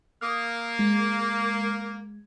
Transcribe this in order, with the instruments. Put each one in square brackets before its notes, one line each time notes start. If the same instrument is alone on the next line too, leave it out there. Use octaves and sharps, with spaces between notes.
[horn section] A#3 [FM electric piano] D#6 F6
[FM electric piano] G#3